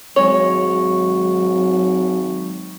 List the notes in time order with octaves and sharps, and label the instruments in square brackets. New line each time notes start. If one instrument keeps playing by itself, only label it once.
[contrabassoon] G#1 [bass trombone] F#3 [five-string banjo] G#3 C#5 [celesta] C#6